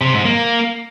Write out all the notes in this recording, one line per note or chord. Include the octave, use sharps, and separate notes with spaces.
C3
G#2
A#3